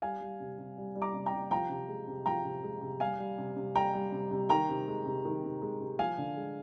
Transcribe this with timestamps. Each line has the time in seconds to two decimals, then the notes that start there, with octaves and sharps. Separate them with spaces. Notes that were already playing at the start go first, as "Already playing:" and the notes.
0.02 G3 F5 G#5
0.21 G3
0.40 C3
0.58 C3
0.77 G3
0.95 G3
1.02 A#5 D6
1.14 C3
1.26 G5 A#5
1.32 C3
1.51 F3 G5 A#5
1.70 C3
1.88 G#3
2.07 C3
2.26 F3 G5 A#5
2.45 C3
2.63 G#3
2.81 C3
3.00 G3 F5 G#5
3.19 G3
3.38 C3
3.57 C3
3.75 G3 G5 A#5
3.94 G3
4.12 C3
4.31 C3
4.49 D#3 G5 A#5
4.69 C3
4.88 G#3
5.06 C3
5.25 D#3
5.44 C3
5.62 G#3
5.81 C3
5.99 F3 F5 G#5
6.18 D3
6.36 G#3